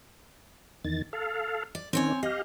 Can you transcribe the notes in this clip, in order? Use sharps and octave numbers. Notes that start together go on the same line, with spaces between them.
E2 D#3 A6
A4 F5
D5
D#3 C4 C#4 C#5 G#5
G4 D#5 F5